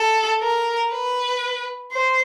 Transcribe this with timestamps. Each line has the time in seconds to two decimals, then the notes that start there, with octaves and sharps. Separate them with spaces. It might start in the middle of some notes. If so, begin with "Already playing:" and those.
Already playing: A4
0.41 A#4
0.92 B4
1.92 C5